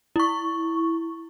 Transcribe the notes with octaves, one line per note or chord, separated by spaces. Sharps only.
E4 C#6